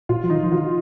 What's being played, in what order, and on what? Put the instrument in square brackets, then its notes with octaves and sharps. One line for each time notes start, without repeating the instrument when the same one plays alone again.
[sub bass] A#2 [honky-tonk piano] F4
[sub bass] F3
[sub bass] D#3 [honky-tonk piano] D#4
[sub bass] F3
[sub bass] D#3 [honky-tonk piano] F4